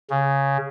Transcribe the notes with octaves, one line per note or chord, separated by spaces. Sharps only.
C#3